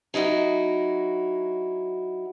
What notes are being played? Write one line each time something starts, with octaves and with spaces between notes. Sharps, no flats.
F#3 D#4 E4 F#4